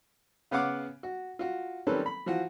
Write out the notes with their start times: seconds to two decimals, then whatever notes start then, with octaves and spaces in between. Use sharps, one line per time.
0.51 C#3 B3 F5 F#5 D6
1.03 F#4
1.39 F4 F#4
1.87 D#3 G3 C4 C#4 A4 B4
2.06 B5
2.26 E3 F3 F4 F#4